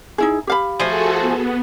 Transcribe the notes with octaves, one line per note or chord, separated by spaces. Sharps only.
D#4 E4 G#4
G4 F5 B5
F3 A3 F#4 G#4 A4 G#5
B3